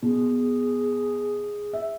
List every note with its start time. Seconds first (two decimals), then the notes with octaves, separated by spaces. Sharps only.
0.03 B2 G#4
1.73 E5